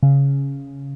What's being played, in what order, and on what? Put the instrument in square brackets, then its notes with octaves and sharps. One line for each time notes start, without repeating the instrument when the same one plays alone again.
[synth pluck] C#3